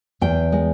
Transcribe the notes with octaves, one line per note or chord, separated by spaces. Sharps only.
E2 G5
G#3